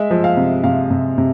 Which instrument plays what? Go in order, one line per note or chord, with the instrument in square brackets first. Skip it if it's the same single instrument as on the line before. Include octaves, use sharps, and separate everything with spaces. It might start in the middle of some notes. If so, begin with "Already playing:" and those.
Already playing: [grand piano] G#3 E5
F3
F5
C3
C3 F5
C3
C3